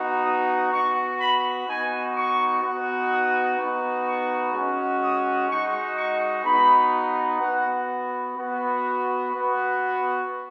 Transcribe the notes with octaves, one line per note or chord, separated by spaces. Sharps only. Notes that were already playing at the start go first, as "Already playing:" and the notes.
Already playing: B3 D#4 F#4
D#6
B3 F#4 C#6
B5
B3 D#4 F#4 G#5
C#6
B3 D#4 F#4
D#6
B3 D#4 F#4
C#6
G#3 C#4 F#4
D#6
G#3 D#4 F#4 C#6
C#6
B3 D#4 F#4 B5
B3 F#4 F#5
B3 F#4
B3 F#4